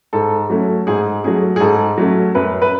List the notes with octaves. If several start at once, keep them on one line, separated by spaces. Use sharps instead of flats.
G#2 A4
F#3 A3 C#4
G#2 G#4
F#3 A3 C#4 G#4
G#4
G#2 A4
F#3 A3 C#4
F#2 B4
B4